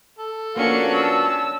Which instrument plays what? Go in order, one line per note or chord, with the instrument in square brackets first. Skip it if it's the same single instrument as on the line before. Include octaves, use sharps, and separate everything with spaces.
[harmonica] A4
[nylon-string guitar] F3 A#3 B3 [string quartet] C#4 D4 F#4 [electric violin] F5 C#7
[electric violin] A5 E6